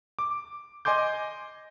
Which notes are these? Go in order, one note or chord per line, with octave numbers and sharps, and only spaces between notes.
D6
D#5 G#5 C6 D6 G6